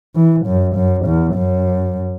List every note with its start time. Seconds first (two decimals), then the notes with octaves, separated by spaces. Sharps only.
0.15 E3
0.46 F#2
0.75 F#2
1.06 E2
1.35 F#2